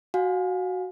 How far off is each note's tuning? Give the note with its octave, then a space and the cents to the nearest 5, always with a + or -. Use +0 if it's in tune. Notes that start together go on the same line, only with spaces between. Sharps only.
F#4 +0 F5 +35 G#5 +0